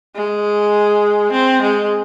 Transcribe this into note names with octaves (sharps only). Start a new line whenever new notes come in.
G#3
C4
G#3